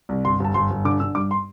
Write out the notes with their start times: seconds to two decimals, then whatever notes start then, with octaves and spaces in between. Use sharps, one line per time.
0.09 C2
0.24 G1 C6
0.40 G1 A5
0.54 G1 C6
0.70 G1
0.85 D3 D6
1.00 D3 E6
1.15 G2 D6
1.31 C6